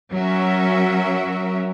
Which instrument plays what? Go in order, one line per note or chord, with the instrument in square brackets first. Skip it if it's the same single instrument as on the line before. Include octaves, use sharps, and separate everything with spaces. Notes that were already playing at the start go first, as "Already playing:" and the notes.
[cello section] F#3 C#4 F#4 A#4 E5